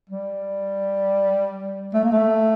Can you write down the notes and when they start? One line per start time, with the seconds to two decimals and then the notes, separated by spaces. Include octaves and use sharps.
0.10 G3
1.94 A3
2.04 A#3
2.12 A3